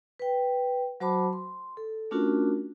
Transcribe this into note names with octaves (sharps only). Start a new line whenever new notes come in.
B4 G5
F#3 F#4 C5 A5 B5 D6
C6
A4
A3 C#4 D4 F4 F#4 A#4